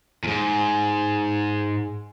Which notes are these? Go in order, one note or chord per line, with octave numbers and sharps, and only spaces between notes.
E2 G#2